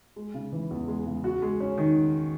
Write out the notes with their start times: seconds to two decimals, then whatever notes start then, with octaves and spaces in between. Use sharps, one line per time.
0.16 G#3
0.34 C#3
0.53 E3
0.71 E2
0.88 G#3
1.06 C#3
1.24 F#4
1.42 G#3
1.60 C#4
1.78 D#3